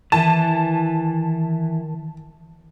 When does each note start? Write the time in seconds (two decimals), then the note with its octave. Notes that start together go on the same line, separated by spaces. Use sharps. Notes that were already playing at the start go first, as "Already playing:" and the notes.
0.12 D#3 E3 E4 A5